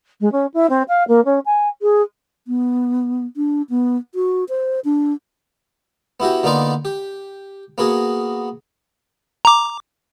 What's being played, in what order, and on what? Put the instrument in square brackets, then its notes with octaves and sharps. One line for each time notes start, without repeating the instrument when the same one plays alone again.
[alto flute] G#3
C#4
E4
C4
F5
A#3
C#4
G#5
G#4
[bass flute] B3
D4
B3
F#4
C5
D4
[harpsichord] B3 E4 F#4 G4
D3 A#3 B3 D#4 F4 D5
G4
A#3 B3 F#4 G#4
[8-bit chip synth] A#5 D6